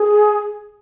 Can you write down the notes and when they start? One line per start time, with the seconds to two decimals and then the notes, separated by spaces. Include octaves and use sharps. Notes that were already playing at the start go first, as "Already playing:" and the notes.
Already playing: G#4